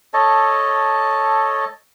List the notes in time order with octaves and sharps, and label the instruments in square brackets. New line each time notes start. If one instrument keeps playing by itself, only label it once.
[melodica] A4 C#5 D#5 A5